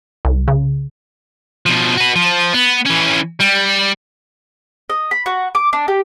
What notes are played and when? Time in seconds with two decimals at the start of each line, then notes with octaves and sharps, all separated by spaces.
0.25 C2
0.48 C#3
1.66 B2 F3
1.97 F#4 B4
2.16 F3
2.54 B3
2.86 E3 C#4
3.40 G3
4.90 D#5
5.11 B5
5.26 F#4
5.55 D6
5.73 D4
5.88 G4